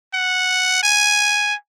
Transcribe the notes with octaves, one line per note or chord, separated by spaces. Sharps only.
F#5
G#5